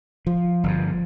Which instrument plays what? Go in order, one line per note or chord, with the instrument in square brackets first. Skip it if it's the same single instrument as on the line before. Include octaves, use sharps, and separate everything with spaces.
[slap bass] F3
G1 G2